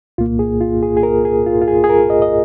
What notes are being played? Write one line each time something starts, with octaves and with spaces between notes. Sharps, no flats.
C2 A#2 A#3 F4
G#4
F4
G#4
G#4
A#4
G#4
F4
F4
G#4
G#4
A#4
D#5
D#5